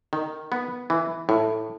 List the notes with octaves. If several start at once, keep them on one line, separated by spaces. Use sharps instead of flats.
D#3
B3
E3
A2